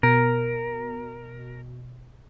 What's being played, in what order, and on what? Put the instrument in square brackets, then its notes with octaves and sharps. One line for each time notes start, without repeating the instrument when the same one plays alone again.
[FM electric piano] B2 [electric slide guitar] A#4